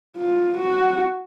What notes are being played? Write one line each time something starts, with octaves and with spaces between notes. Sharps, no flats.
F4
F#4